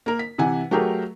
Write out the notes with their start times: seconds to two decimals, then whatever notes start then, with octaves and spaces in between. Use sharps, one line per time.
0.06 A#3 A#4
0.19 B6
0.38 C3 E3 F#5 G#5
0.71 F#3 A3 G4 G#4 A#4